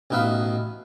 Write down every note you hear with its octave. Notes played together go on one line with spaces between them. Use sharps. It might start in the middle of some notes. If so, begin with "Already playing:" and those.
A1 B2 D#4 B4 E5 F5